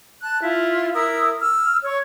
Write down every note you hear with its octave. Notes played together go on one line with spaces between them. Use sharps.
A5 F#6
E4 F4
E4 A#4 D#6 E6
E6 F6
C#5 C#6